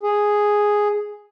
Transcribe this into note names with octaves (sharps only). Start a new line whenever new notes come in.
G#4